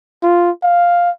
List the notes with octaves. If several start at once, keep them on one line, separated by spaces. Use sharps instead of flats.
F4
F5